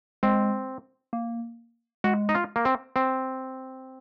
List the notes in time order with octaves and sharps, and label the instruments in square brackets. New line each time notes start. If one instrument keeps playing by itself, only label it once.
[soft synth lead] G#3 [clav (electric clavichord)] C4
[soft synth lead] A#3
[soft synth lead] G#3 [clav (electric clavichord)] F#4
[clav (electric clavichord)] D#4
F4
A#3
C4
C4